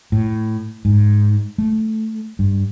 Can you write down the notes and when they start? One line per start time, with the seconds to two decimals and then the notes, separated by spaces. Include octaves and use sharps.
0.12 A2
0.85 G#2
1.58 A3
2.39 G2